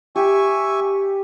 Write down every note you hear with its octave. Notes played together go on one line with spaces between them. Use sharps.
G4 E5 G#5 C#6